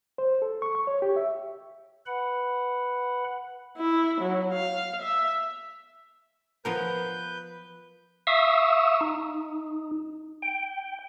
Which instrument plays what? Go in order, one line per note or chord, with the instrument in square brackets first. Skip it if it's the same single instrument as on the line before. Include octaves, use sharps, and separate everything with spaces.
[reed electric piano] C5
A4
C#6
C#6
C#5
G4
E5
[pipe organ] B4 F#5 B5
[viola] E4
F#3
F5
E5
[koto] F3 B3 A#4 [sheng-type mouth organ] B4 G6
[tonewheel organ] E5 F5 C#6 D#6 E6
D#4
G5